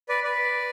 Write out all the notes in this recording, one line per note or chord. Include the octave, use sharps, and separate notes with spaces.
B4 D5
B4 D5